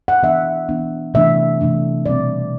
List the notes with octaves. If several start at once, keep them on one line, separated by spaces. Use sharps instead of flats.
F#5
E3 B3 D4 E5
E3 B3 D4
C3 E3 A3 D4 E5
C3 E3 A3 D4
B2 G3 C4 D5